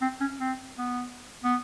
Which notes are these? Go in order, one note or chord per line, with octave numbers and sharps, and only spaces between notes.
C4
C#4
C4
B3
B3